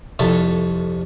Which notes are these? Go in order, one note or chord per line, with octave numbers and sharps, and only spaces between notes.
C2 F2 C3 A4 E5